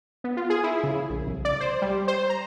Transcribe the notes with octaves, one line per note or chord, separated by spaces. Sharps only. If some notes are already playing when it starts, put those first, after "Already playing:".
B3
F4
G#4
E4
C#3
A#1
C2
D5
C5
G3
C5
A#5